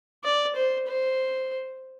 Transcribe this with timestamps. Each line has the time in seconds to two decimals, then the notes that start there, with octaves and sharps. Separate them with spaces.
0.24 D5
0.55 C5
0.88 C5